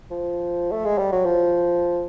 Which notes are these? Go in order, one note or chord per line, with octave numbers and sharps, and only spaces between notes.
F3
A3
G#3
G3
F#3
F3